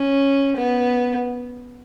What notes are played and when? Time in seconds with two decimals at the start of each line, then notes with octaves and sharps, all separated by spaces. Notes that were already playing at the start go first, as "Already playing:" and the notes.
Already playing: C#4
0.56 B3